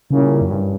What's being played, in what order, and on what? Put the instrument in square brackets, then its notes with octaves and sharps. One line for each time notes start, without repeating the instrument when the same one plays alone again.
[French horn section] A#2 G3 A#3 C#4 E4 [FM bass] C#3
[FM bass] F#2
G2